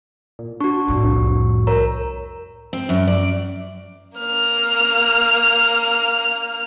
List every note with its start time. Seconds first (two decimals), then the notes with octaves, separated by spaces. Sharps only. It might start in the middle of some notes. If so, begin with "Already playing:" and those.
0.39 A#2
0.60 D4 F#4 C#6
0.88 F2 A2
1.04 C2
1.67 A#4 C#5 A#5
2.73 C4
2.89 F#2
3.07 D5
4.17 A#3 F6